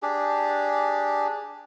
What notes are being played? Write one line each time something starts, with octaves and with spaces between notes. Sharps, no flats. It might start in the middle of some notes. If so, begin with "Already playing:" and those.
D4 G4 G#4